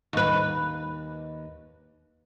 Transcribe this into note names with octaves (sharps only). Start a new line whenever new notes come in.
D#2 B4